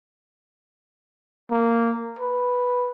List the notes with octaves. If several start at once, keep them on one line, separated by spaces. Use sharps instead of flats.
A#3
B4